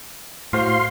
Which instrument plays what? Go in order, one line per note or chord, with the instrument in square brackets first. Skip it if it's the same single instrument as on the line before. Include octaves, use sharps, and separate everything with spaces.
[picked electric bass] A2 [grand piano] F#4 C5 [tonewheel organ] F5 C6